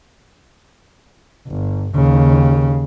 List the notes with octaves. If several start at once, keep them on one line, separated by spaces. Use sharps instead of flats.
G1
D#2 C#3